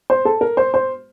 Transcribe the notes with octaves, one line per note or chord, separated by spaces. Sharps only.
C5
A4
A#4
C5
C5